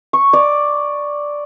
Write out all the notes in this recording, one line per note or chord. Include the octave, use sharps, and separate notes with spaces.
C#6
D5